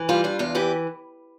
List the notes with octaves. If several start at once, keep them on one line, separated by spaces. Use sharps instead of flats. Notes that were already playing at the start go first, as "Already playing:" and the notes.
Already playing: E3
G3 F4
D4 F4
E2 F4
E3 G4